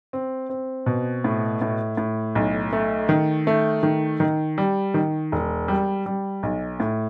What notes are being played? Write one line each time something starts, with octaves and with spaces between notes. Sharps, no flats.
C4
C4
B2
A2
A2
A2
B1
A3
D#3
A3
D#3
D#3
G3
D#3
E1
G3
G3
B1
A2